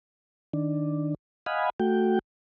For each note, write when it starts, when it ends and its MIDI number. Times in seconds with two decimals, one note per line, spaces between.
0.53 1.15 51
0.53 1.15 62
1.46 1.70 75
1.46 1.70 77
1.46 1.70 78
1.46 1.70 80
1.46 1.70 83
1.80 2.19 57
1.80 2.19 66
1.80 2.19 79